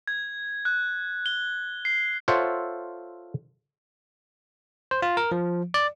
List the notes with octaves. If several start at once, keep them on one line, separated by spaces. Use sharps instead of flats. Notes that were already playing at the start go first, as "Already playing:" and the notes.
G#6
F#6
G7
C7
F4 A4 C5 C#5 E5 F#5
C5
F4
A#4
F3
D5